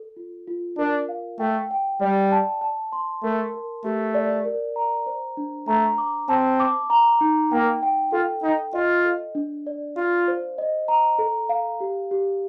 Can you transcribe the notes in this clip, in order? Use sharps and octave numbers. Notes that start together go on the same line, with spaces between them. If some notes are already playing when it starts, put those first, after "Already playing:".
Already playing: A4
F4
F4
D4 A#4
F5
A3 G5
G5
G3 D5
A5
A5
C6
A3 A#4
A#4
A3 G4
D5
A#4
A#5
C5
D4
A3 A#5
D6
C4 A5
D6
A#5
D#4
A#3 G5
G5
F4 A4
D#4 G5
F4 D#5
A4
D4
D5
F4 F5
C5
D#5
A#5
A4
F5
G4
G4